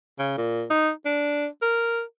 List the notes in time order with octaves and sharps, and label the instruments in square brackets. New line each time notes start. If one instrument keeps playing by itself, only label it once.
[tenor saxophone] C#3
A#2
D#4
D4
A#4